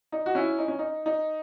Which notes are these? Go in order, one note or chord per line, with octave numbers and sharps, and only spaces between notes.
D#4
F#4
C#4 E4
D#4
C#4
D#4
D#4